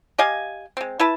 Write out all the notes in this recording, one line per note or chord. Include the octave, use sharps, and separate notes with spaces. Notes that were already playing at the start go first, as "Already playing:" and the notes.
G4 D#5 F5 G#5
G#3 C4
E4 B4 A5